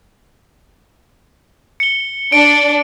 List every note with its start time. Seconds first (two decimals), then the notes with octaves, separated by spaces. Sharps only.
1.80 C#7 G7
2.32 D4 D5 D7